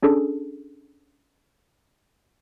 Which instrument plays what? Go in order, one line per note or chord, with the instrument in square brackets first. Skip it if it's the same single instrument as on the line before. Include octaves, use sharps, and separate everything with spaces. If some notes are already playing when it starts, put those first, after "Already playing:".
[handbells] C#4 D4 G#4 A4